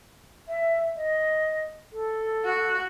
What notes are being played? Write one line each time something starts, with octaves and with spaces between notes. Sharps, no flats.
E5
D#5
A4
F#4